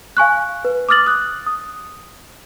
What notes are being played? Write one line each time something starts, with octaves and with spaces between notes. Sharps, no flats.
F5 G#5 C#6 F#6
B4
D6 D#6 F6 A6 F#7
D#6 F#6
D#6